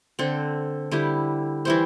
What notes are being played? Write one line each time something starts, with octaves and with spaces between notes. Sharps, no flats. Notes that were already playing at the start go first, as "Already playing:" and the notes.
D3 C4 A4
D3 G3 E4 G4
E3 G3 E4 C5